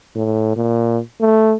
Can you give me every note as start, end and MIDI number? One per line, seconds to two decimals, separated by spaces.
0.15 0.56 45
0.56 0.98 46
1.21 1.56 57